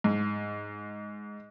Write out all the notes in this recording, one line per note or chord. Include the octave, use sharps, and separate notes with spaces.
G#2